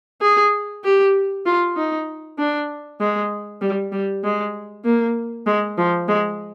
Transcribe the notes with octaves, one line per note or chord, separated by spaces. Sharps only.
G#4
G4
F4
D#4
D4
G#3
G3
G3
G#3
A#3
G#3
F3
G#3